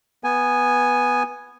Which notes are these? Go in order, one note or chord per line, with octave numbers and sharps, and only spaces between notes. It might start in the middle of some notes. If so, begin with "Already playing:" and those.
B3 G#5